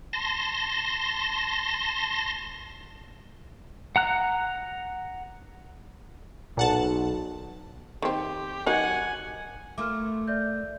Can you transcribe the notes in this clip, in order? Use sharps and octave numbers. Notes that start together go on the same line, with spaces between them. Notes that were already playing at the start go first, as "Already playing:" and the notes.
A5 C6 A#6
F#5 A#5 F#6
B1 A#2 F#5 A5
D#3 C4 G4
F#3 D#4 A#4 F#5 G#5
A3 A#3 F4 D6 F6
D5 E5 G6